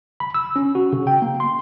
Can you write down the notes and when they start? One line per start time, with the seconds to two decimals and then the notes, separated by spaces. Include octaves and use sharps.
0.20 B5
0.34 E6
0.56 C#4
0.75 F#4
0.93 C#3
1.07 G5
1.22 A#3
1.40 C6